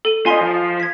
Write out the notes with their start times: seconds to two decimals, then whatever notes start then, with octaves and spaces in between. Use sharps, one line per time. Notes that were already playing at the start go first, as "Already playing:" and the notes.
0.05 A4 D#7
0.26 F4 D#5 G#5 C6 B6
0.41 F3
0.80 G#6 B6